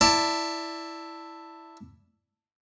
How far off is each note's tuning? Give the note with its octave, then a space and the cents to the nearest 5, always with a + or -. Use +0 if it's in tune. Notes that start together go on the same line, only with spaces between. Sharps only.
E4 +0 D5 +0 A5 +20